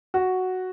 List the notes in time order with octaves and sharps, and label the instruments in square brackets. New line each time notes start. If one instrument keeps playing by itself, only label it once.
[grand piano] F#4